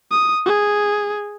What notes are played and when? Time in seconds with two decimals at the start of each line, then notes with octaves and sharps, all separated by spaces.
0.11 D#6
0.46 G#4